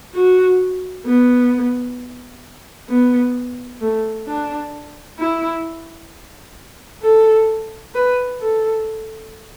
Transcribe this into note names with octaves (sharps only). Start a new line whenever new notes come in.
F#4
B3
B3
A3
D4
E4
A4
B4
A4